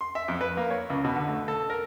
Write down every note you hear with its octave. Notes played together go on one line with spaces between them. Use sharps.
C6
E5
F2
B4
A#3
C#5
C#2
B2
D3
A3
A4
A#4